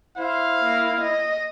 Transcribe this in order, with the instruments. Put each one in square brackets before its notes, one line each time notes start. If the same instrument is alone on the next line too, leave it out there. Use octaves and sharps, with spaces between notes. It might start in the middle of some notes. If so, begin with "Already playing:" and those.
[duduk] E4 [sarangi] C5 [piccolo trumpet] F5
[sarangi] A#3
D#5